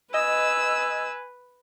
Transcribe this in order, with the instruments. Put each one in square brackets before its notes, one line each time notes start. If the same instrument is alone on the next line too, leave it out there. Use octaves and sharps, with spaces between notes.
[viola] B4 [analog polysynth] D#5 [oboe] G#5 [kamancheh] E6